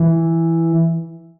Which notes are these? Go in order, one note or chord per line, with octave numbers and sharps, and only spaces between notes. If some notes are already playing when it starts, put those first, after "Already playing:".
Already playing: E3